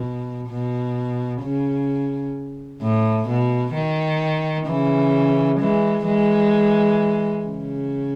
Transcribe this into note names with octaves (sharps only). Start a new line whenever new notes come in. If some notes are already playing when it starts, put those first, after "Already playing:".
Already playing: B2
B2
C#3
A2
B2
D#3
C#3 E3
E3 G#3
E3 G#3
C#3